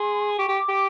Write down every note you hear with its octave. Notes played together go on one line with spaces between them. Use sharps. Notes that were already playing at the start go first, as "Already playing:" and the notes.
Already playing: G#4 C6
G4 C#6
G4 D6
G4